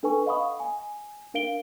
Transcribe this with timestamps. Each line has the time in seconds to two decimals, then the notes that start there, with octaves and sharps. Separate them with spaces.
0.03 D4 A4 B4 G#5 C#6
0.26 D#5 F5 F#5 B5 C#6 D#6
0.60 G#5
1.34 D4 A#4 F5 D7 G7